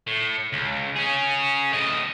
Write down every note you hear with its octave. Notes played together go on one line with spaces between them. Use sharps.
A2
C#2
C#4 G#4
A2 D#5